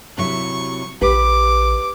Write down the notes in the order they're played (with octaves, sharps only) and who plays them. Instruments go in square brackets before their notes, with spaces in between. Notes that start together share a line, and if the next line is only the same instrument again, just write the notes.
[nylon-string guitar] C3 F#3 E4 [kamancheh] C#6
[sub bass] A#1 [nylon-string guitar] G4 B4 [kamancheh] D6